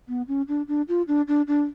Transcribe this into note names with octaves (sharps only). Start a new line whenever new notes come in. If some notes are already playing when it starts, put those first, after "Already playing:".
B3
C#4
D4
D4
F4
D4
D4
D4